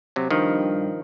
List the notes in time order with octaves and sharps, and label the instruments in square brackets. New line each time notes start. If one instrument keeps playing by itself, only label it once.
[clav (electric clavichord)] C3 F#3
[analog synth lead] G2 [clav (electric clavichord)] D#3 F3